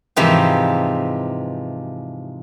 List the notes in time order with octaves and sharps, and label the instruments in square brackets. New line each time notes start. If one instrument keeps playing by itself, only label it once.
[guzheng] G#2 C3 E3 F3 D#4 G4